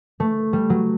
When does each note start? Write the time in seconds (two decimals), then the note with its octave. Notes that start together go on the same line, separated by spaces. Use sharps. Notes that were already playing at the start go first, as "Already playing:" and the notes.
0.20 A3
0.53 G3
0.70 F#3